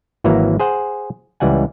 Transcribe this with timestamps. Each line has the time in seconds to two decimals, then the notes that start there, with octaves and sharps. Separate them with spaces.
0.24 G#1 E3 F#3 A#3 A#5
0.60 G#4 C5 F#5
1.40 C#2 E3 G3 F#5 G#5